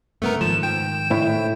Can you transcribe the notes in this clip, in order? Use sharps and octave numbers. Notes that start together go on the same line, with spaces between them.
G2 C#3 A3 B3 A#4
G#2 D#3 F3 E7
G5 E7
A2 E4